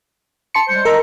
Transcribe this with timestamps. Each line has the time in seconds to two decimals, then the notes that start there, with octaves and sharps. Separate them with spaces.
0.55 A5 C6 C#7
0.69 G3 G#3 C5
0.85 A#4 D#5 A#5 E6